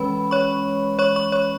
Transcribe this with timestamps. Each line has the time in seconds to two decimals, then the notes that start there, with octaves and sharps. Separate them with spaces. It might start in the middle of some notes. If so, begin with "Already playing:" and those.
Already playing: E3 G#3 C#4 B4 B5
0.31 C#5 C#6
0.99 C#5 C#6
1.16 C#5 C#6
1.32 C#5 C#6